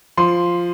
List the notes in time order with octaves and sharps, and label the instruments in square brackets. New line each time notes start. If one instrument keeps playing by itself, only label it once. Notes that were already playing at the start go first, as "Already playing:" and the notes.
[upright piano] F3 C6